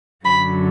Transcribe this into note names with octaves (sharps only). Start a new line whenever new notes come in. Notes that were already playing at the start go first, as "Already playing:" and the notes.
F#2 D3 F#3 B5